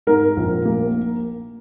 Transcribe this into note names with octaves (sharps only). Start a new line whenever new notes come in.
G#2 A#4
A#1
A#3